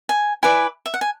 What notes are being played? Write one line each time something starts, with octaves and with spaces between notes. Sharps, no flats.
G#5
E4 B4 D5 G#5
E5
F#5
G#5